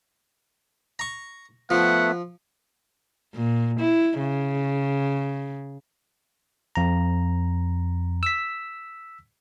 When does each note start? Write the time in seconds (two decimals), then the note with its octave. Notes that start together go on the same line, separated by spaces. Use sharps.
0.99 A#5 C#6
1.70 F3 A3 B3 E5 F#5
3.34 A#2
3.80 E4
4.19 C#3
6.75 F2 A#5
8.23 E6 B6